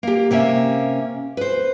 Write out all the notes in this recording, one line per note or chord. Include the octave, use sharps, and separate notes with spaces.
A#3 G4
C3 A#3 C#4 E5
B4 C5